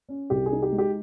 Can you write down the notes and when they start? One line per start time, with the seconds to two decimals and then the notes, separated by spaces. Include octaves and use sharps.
0.09 C#4
0.30 C2 G4
0.46 G#4
0.52 D#4
0.62 G4
0.72 G#3
0.78 G4